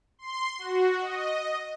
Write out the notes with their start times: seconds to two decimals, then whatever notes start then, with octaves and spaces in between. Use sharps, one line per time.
0.19 C6
0.58 F#4
1.01 D#5